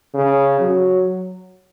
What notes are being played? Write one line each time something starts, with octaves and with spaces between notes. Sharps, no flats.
C#3
F#3